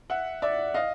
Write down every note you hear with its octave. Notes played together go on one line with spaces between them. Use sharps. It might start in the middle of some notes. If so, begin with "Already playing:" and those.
E5 F#5
D5 E5
D#5 F5